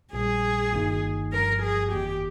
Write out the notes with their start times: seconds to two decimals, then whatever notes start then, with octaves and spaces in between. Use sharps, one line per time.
0.13 A#1 A#2 G3 G#4
0.73 G1 G2 D#3 A#3 D#4
1.32 G1 G2 F3 A#4
1.62 G#4
1.92 G1 F2 D#3 A#3 G4